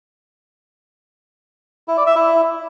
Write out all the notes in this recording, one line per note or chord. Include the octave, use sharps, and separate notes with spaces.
E4
D5
E5
E4